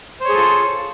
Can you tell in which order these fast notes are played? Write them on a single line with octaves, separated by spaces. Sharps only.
C5 C#5 G#4 A4 F4